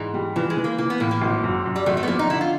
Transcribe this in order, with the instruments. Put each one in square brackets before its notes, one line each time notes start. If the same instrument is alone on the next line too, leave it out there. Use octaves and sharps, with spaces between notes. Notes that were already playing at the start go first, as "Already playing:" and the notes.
Already playing: [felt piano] G#2 [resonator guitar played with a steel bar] E3
[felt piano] G3
[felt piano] E3 [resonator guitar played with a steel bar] F3
[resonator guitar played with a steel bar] G#3
[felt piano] E3
[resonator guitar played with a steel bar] A#3
[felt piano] E3 [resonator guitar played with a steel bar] A#3
[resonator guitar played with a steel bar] B3
[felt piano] A2 [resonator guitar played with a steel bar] A#3
[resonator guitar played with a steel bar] A#3
[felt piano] G#1
F#2
F#2
[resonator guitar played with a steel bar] G3
[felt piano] G#1 [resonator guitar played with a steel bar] A3
[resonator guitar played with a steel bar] A3
B3
[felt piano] F3 [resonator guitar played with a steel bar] A#3
[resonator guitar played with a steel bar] D#4
[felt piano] D3 [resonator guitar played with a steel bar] E4
[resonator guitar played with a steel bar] F4